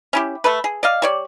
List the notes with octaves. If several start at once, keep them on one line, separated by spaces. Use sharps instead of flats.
C#4 E4 G4
A3 A4 B4
G#4
D5 D#5 F5
G3 C#5 D5